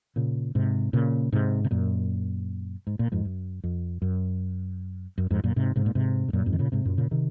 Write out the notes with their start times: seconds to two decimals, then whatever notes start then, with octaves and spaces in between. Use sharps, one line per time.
0.16 A#2 C#3
0.55 G#2 C3
0.93 A#2 C#3
1.33 G#2 C3
1.64 C3
1.71 F#2 A#2
2.87 G#2
2.99 A#2
3.12 F2 G#2
3.25 F#2
3.64 F2
4.02 F#2
5.18 F#2
5.31 F2 G#2
5.44 F#2 A#2
5.56 G#2 C3
5.76 G#2 C3
5.86 A#2
5.95 G#2 C3
6.28 G#2
6.33 F#2 A#2
6.46 F2 G#2
6.53 D#3
6.59 A#2 C#3
6.72 G#2 C3
6.85 F#2 A#2
6.98 A#2 C#3
7.11 C3 D#3